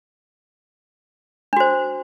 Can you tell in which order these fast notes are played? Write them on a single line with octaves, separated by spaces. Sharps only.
D4 F#4 C5